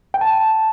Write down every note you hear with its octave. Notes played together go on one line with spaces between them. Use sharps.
G5
A5